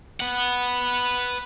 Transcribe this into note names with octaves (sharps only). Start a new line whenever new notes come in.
B4 F#5